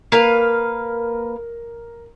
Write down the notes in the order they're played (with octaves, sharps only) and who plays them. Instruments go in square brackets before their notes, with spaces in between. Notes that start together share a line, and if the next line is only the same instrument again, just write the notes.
[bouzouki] A#3 B4 F5 [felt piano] A#4